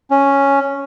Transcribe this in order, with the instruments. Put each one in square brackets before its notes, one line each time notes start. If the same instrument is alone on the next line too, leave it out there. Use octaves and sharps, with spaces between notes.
[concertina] C#4